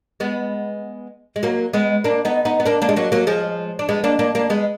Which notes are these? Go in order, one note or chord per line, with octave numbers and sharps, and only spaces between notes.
G#3 B3
G#3
F#3 A#3
G#3 B3
A#3 D4
B3 D#4
B3 D#4
B3
A#3 D4
A#3 D4
G#3
F#3 A#3
F#3 A#3
F3 G#3
D4
G#3 B3
A#3 D4
A#3 D4
A#3 D4
G#3 B3